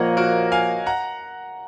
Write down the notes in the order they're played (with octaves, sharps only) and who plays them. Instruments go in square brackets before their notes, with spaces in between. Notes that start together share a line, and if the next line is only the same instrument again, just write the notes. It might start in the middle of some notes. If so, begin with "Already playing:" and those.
Already playing: [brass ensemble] A#2 F3 A#3 [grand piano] C#5 D#5 F#5
[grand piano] F#4 A#4
F5 G#5
F#5 A#5